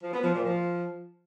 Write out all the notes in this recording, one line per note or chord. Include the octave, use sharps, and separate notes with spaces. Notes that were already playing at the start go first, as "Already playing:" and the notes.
F3
B3
F3
A#2
F3